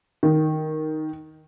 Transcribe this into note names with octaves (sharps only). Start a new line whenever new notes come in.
D#3